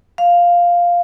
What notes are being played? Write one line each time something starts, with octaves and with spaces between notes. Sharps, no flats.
F5